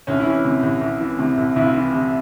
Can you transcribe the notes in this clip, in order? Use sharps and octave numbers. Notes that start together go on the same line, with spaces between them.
C2 C#4
E4
E3 C#4
C3
C2
C2
E3
C3
C2
C2 E4
F4
E3 E4
C3